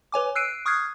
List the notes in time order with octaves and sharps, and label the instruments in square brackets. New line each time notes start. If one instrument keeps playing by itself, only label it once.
[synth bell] B4 C#5 G#5 D6
E6 F#6 C7 D7 D#7
C#6 D#6 F6 F#6 G#6 C7